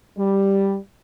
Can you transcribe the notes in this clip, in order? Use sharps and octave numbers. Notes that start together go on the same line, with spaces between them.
G3